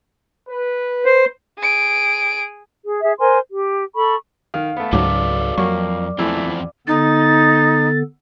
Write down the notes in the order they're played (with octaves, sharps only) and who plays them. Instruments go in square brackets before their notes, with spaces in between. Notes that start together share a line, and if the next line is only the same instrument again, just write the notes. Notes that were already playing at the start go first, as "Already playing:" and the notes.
[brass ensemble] B4
[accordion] C5
[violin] G#4 D7
[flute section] G#4
G#4 E5
A#4 C5 G#5 C6
G4
A4 B5 C#6
[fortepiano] D#3 [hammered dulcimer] F5
[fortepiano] A3 B3
[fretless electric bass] C#2 G#2 F#3 [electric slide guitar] F#4 A4 B4 [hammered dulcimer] D5
[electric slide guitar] F2 [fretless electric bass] F#3 [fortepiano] A#3 C#6
[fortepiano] A#1 E3 A3 [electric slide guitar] E2 F3 C4
[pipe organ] D3 B3 A4 [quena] D#4 [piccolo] A6